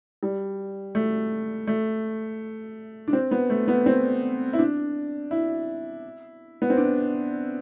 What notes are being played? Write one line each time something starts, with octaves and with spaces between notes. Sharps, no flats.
G3
A3
A3
D4
C4
B3
A3
B3
C4
E4
D4
E4
B3
C4
D4